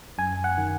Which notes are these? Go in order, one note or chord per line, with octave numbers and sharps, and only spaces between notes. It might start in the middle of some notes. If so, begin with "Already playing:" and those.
F#2 G#5
F#5
D#3